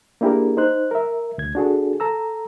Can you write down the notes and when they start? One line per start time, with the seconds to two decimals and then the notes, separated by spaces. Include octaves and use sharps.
0.21 A#3 D4 E4 G4 G#4 A#4
0.57 D#4 C5 F#6
0.91 A#4 E5
1.38 D2 G#6
1.55 D4 F#4 G#4 A4
2.00 A4 A#5 E6